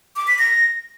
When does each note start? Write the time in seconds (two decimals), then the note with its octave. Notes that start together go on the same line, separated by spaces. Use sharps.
0.16 D6
0.27 B6
0.39 A#6